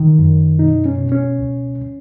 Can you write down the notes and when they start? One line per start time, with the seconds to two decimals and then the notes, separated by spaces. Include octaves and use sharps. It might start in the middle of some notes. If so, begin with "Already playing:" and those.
Already playing: D#3
0.19 F#2
0.59 B2 D#4
0.86 C#4
0.98 B2
1.12 C#4
1.38 C#2